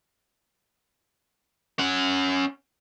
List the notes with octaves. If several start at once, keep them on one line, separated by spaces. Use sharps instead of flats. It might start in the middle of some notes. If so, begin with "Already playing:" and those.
C#4 F#5